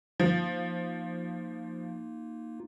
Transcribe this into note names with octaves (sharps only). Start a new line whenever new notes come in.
F3 A#3 D#4 F4